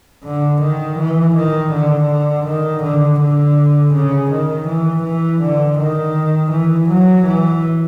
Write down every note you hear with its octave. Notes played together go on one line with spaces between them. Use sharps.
D3
D#3
E3
D#3
D3
D#3
D3
D3
C#3
D#3
E3
E3
D3
D#3
E3
F#3
E3